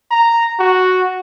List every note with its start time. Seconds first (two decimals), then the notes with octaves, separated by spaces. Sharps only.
0.11 A#5
0.59 F#4